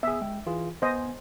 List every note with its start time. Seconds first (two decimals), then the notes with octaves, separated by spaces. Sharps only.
0.03 B3 G#4 E5
0.21 G#3 G5
0.46 E3 F4 G#4
0.82 B3 C5 D#5 G#5